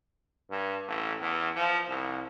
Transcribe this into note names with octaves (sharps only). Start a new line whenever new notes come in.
G2
A1
E2
F3
C2